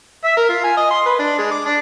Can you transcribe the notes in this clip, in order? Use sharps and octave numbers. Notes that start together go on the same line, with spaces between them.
E5
A#4
F4
G#5
D#5
C6
B4
D4
G#3
D6
D4